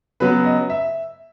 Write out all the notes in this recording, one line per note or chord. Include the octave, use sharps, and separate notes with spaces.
C#3 F#3 B3 B4
D#5
E5